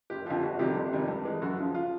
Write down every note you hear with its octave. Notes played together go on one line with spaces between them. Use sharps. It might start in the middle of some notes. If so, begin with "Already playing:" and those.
F#1 G4
F2 D3 F3 G4
G1 F#4
F2 C3 D#3 G3 G4
G1
F2 C3 D#3 G3
G2
E3 G#3
F#2 F#4
C#3 F3
F4